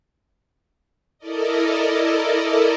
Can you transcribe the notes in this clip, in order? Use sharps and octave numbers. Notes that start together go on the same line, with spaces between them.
E4 A4 A#4 D5 D#5